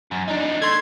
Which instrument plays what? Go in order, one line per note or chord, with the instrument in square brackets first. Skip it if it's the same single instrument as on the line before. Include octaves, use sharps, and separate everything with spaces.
[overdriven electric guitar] F#2
D4 D#4
[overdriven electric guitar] A3 [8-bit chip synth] C6 G#6